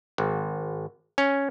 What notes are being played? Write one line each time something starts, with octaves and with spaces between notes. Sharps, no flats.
G#1
C#4